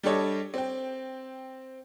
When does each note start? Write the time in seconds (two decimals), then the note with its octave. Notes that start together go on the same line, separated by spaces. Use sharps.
0.03 G3 D4 G4 A4 C#5 D#5
0.54 C4 G5